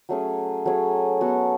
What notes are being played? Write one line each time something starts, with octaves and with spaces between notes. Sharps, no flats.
F#3 A3 C#4 G#4
F#3 A3 C#4 G#4
B3 F#4 A4